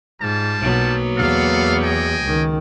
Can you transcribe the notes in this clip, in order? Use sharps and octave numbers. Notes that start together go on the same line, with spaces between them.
G#2 G3 F4 A5
B1 F#3 A#3 B3
E2 A4 F5
D#5 G5 G#5
C#2 D#3